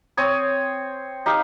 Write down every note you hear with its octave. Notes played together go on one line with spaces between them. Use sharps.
C4 C#5 G#5 D#6
D#4 G4 F5